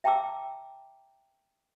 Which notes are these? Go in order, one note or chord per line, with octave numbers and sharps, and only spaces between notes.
E5 G5 A5 A#5 D6 E6